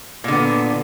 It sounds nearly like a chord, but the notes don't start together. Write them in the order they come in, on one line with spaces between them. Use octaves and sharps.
A#2 D3 B3